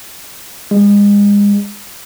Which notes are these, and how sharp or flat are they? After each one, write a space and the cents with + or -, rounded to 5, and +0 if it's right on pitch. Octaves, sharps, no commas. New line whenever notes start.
G#3 -35